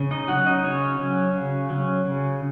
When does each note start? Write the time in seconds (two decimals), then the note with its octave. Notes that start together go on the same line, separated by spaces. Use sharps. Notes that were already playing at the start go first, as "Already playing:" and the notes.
Already playing: C#3
0.11 D#4 D#5
0.28 F#3 C#4 F#4 F#5
0.46 D#4 D#5
0.64 C#3 C#4 C#5
0.99 F#3 C#4
1.34 C#3
1.70 F#3 C#4
2.05 C#3